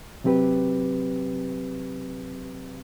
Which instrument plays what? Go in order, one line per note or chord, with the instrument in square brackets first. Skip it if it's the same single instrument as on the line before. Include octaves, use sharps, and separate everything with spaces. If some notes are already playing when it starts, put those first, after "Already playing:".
[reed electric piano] C3 F#3 C4 G4 B4